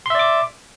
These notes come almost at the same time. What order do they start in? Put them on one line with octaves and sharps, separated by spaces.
C6 E5 D5 D6